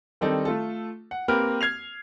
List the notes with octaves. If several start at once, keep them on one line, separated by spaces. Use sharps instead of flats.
D#3 G3 C4 D4 D#4 A4
A3 F4 A4
F#5
A#3 C4 G4 A#4 B4 F6
F6 G#6 C7 F7